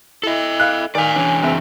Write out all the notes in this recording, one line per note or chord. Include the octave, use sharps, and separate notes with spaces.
E4 A4 D#5
F5 F#6
D#3 D5 F5 G#5
E3 C#4 D4
F#1 C4 E5